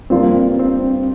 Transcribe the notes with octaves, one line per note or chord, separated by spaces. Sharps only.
G2 F3 A#3 C4 F4
C4